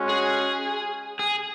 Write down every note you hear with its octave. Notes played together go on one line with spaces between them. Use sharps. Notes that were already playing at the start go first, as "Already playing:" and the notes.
Already playing: G#3 C#4 F#4
G#4
G#4